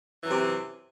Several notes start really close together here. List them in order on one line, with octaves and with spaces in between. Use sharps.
E3 F#2 C3